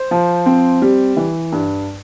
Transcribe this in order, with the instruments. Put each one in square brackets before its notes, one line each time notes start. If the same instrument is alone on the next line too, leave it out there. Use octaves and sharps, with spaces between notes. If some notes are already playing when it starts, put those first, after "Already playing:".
Already playing: [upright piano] C5
F3
C4
G3
E3
G2